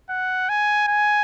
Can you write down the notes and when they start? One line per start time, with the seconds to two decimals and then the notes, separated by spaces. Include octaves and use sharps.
0.09 F#5
0.49 G#5
0.87 G#5